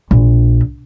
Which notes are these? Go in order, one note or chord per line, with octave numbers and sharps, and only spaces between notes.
A#1